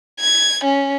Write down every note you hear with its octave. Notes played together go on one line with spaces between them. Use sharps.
G#6
C#4